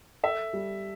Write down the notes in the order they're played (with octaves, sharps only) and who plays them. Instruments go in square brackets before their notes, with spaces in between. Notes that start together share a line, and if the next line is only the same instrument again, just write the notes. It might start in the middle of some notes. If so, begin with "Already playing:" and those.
[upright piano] A4 [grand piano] E5
[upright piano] G3